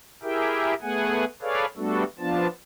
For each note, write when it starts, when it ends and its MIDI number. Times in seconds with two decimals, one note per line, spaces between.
0.23 0.74 64
0.23 0.74 67
0.23 0.74 68
0.23 0.74 70
0.23 0.74 76
0.23 0.74 79
0.82 1.25 57
0.82 1.25 59
0.82 1.25 68
0.82 1.25 78
0.82 1.25 80
1.42 1.65 68
1.42 1.65 69
1.42 1.65 71
1.42 1.65 73
1.42 1.65 74
1.42 1.65 77
1.77 2.04 55
1.77 2.04 57
1.77 2.04 59
1.77 2.04 62
1.77 2.04 66
1.77 2.04 69
2.19 2.47 53
2.19 2.47 59
2.19 2.47 62
2.19 2.47 65
2.19 2.47 81